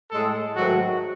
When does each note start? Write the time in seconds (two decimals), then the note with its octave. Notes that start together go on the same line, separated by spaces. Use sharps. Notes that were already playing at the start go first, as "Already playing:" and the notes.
0.11 A2 G#3 A4
0.56 G#2 D#3 F#3 A3 F#4